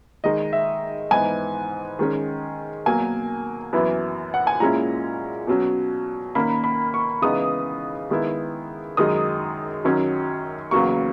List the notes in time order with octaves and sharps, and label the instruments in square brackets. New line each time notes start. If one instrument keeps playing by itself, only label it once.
[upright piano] D#3 G#3 D#4 D#5
E5
G#2 E3 B3 D#4 G#5
D#3 G#3 C#4
B2 F#3 A#3 G#5
F#2 E3 B3 E4
F#5
G#5
A#2 G#3 C#4 E4 A#5
B2 F#3 C#4
D#3 A#3 C#4 B5
B5
C#6
C#3 E3 G#3 B3 D#4 D#6
D#3 G#3 B3 E4
F#2 D#3 G#3 D#4 D#6
F#2 D#3 F#3 C#4
E2 C#3 F#3 A#3 C#6